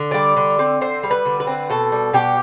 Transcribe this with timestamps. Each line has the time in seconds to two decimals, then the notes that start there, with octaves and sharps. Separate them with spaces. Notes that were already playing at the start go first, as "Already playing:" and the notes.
Already playing: D3
0.11 G3 D5
0.37 D3
0.59 C4
0.81 D3 C5
1.03 G3
1.11 B4
1.25 D3
1.40 B4
1.47 C4
1.70 B2 A4
1.92 G3
2.13 B2 G4